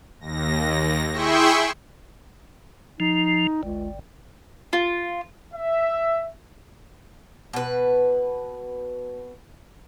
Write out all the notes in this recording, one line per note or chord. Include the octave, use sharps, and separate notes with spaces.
D#2 A#6
E4 G#4 E5 G5 C6 C#6
F3 D#4
G1 C#2
F4
E5
B2 B4